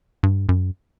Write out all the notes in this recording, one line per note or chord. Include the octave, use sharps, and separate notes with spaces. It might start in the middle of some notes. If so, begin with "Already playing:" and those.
G2
F#2